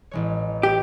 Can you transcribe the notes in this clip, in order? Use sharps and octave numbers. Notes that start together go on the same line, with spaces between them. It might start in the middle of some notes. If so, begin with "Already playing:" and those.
A1 G#3 C#5
G4